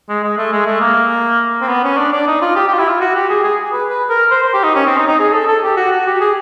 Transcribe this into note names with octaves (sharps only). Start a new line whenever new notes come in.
G#3
G#3
A3
G#3
A3
A#3
C4
B3
C#4
D4
D4
D#4
F4
G4
G4
F4
E4
F4
F#4
G4
G#4
G#4
B4
B4
A#4
C5
C5
G4
D#4
C#4
C4
D#4
D#4
G#4
A4
A4
G4
F#4
F#4
G4
G#4